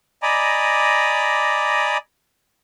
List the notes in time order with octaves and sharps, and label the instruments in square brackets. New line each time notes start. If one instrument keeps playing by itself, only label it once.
[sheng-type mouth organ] D5 D#5 G#5 A#5 B5 D6